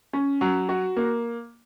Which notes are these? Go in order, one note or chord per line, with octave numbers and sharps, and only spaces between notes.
C#4
F#3
F#4
A#3